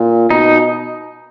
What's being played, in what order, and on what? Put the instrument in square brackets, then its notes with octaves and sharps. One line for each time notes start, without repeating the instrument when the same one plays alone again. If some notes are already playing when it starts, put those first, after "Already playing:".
Already playing: [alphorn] A#2
[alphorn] B2 [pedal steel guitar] D#4